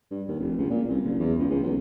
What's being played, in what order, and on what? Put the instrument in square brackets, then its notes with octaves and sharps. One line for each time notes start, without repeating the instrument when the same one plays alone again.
[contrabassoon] G2
D#2
F1
C#2
A#2
C2
F#1
E2
C#2
C#2
B1